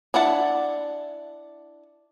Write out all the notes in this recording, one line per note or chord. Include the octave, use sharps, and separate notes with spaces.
D4 E4 F#5 A5